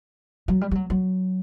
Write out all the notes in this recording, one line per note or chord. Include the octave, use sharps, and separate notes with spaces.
F#3
G3
G3
F#3
F#3